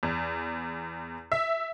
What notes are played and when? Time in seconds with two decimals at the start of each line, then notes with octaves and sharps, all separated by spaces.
0.03 E2
1.32 E5